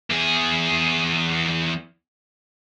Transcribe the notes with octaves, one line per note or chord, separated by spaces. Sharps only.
E2 G#4